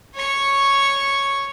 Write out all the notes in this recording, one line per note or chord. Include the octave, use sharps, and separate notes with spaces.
C#5 C#6